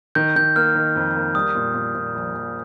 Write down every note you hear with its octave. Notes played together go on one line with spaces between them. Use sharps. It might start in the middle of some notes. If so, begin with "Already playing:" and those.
D#3 G6
D#3 G6
A#3 F6
D#3
F2
A#3
G3 D#6
A#2
A#2
A#2
A#1
A#1